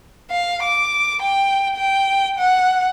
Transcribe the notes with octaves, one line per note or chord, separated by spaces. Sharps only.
F5
D6
G5
G5
F#5